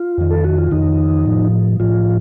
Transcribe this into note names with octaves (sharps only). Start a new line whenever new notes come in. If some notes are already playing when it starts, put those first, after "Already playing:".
Already playing: F4
F2 D#3
A4
F#4
F4
F2 D#3 D#4
A2 F3
A2 F3 F4